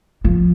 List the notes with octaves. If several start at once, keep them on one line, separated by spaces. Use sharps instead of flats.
F3